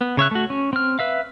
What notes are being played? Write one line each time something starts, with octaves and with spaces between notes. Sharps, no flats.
B3
C#3 C#5 E5 F#6
A3 F#4
C#4
C4 F6
B4 E5 F5